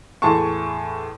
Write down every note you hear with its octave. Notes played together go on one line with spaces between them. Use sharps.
E2 A2 G#4 A5 C6 C#6